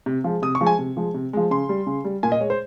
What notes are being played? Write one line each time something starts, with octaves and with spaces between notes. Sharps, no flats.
C3
F3 G#3
C3 D#6
C#6
F3 G#3
G#5
C3
F3 G#3
C3
F3 G#3
C#3 C6
G3
C#3
G3
A#2 G#5
D#5
G#3 C#5
C5